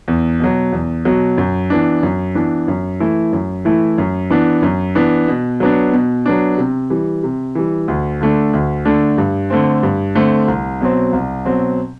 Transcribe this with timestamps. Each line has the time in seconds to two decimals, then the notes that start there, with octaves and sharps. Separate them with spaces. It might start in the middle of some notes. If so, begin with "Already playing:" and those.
0.08 E2
0.40 B2 F#3
0.72 E2
1.05 B2 F#3
1.38 F#2
1.70 E3 B3 D4
2.03 F#2
2.35 E3 B3 D4
2.68 F#2
3.00 E3 A3 E4
3.33 F#2
3.65 E3 A3 E4
3.98 F#2
4.30 E3 B3 D4
4.62 F#2
4.95 E3 B3 D4
5.28 B2
5.60 F#3 B3 D4
5.93 B2
6.26 F#3 B3 D4
6.58 C3
6.90 E3 G3
7.23 C3
7.55 E3 G3
7.88 D2
8.21 D3 A3 D4
8.53 D2
8.85 D3 A3 D4
9.18 G2
9.50 D3 A3 C4
9.83 G2
10.15 D3 A3 C4
10.48 C2
10.81 B2 F#3 C4
11.13 C2
11.45 B2 F#3 C4